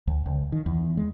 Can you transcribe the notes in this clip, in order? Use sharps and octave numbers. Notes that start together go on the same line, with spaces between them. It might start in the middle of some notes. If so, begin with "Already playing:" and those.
D2
C#2
D#3
E2
G#3